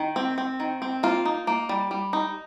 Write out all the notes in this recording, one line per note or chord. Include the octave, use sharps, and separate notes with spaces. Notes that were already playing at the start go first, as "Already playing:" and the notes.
Already playing: D#3
C4
C4
D#3
C4
A#3 F4
D#4
A#3
G3
G3
D#4